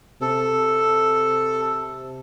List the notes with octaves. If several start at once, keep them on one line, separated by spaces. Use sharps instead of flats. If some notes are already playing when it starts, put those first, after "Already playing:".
C3 A4